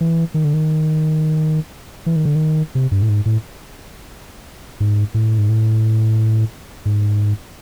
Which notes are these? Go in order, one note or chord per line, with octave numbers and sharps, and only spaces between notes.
E3
D#3
D3
D#3
E3
D#3
D3
D#3
C3
G2
A2
G#2
A2
G#2
A2
G#2
A2
G#2